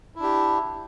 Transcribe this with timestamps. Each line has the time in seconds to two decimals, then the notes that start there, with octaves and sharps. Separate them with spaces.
0.16 E4
0.19 D4
0.23 G4